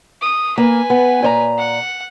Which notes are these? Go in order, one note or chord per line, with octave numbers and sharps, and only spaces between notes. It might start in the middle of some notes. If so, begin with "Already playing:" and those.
D#6
A#3 B4 G#5
B3
A#2 C5 A#5
F#5